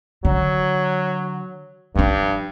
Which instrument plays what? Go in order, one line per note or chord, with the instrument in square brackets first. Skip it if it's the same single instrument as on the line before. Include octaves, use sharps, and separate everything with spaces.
[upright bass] D3 [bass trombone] F#3
[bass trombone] G2 [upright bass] F3 D4